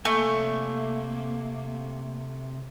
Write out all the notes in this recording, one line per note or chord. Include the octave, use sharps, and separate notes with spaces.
C3 A3 A#3 G#5